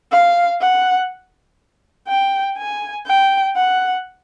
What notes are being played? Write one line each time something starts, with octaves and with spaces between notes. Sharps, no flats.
F5
F#5
G5
G#5
G5
F#5